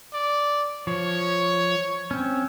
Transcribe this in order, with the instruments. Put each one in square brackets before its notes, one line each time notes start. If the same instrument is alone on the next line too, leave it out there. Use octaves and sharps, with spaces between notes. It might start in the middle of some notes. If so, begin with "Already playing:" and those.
[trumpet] D5
[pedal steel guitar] F3 [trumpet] C#5
[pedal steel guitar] C4 C#4